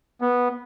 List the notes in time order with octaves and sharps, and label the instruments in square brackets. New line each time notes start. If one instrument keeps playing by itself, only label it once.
[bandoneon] B3